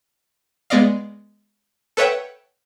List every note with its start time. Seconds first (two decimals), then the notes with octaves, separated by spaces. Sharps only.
0.70 G#3 B3 D5 D#5 F5
1.97 A4 B4 C#5 E5 F#5 G5